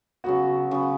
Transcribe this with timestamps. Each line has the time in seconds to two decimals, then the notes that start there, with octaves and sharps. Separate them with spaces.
0.24 C#3 F#3 B3 F#4
0.71 C#3 F#3 B3